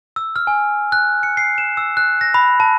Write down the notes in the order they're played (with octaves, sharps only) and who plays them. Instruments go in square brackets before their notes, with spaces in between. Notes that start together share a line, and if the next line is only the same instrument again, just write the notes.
[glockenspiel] E6
F6
G#5
F#6
C#7
C7
E7
E6
F#6
A#6
B5
A5